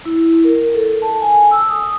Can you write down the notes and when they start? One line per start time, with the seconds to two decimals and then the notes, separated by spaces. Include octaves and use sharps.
0.05 E4
0.44 A#4
0.75 A4
1.02 A5
1.21 G#5
1.51 E6
1.68 D#6